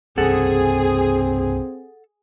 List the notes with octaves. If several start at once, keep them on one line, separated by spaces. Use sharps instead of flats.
C2 G2 C#3 C4 G#4 A4 F#5